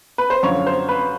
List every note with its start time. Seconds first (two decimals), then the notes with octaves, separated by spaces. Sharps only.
0.18 B4
0.30 C5
0.43 F#2 D3 F3 C#5
0.67 C5
0.89 B4